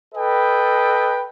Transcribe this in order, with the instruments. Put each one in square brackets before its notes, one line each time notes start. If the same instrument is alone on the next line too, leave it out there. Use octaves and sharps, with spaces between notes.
[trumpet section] A4 B4 D#5 G5